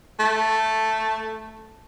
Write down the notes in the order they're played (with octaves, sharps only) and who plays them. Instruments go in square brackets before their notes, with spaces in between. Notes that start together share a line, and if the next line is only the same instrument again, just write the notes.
[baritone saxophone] A3